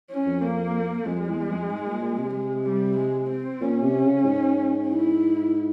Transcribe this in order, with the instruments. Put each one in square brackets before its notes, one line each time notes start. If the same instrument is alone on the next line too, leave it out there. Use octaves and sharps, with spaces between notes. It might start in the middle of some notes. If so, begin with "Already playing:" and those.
[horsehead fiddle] C#4
[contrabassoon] F2
[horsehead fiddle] A#3
[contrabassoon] F2 [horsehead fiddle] G#3
[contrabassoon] E2
F2
G#2
A#2
A#2
C3
[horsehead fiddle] G#3
G3
G#3
C4
[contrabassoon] A#2 [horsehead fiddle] C#4
[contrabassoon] C3
C#3
G#2
[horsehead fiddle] E4